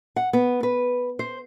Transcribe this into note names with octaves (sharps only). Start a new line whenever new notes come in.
F#5
B3
B4
C5